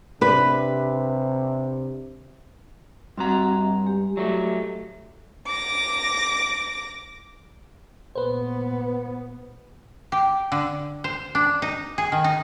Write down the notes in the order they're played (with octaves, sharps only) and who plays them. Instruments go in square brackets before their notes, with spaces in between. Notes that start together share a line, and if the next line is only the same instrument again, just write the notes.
[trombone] C3 [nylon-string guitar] D4 B4
[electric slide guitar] G2 A#5 [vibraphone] C4 F#4 F#5
[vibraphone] G#3 G4
[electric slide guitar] F#3 A3
[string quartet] D6 A#6
[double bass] A#2 B3 [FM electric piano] B4 C5
[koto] G4
D3
C5
D4
D#4
G#4
D#3
D#4